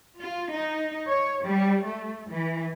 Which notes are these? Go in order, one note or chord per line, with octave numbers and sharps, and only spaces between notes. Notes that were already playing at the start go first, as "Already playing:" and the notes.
F4
D#4
C#5
G3
A3
E3